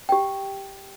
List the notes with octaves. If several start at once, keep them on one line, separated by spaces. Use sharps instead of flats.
G4 G5